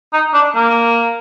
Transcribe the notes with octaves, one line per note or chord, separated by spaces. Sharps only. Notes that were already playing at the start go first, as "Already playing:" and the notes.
D#4
D4
A#3